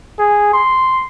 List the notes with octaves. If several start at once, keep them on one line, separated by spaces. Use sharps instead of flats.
G#4
C6